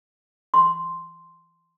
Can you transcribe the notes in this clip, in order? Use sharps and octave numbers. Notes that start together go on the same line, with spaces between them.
C6